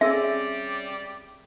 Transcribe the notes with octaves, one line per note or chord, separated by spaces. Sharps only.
G3 C4 C#4 G4 G#4 D5 E5 E6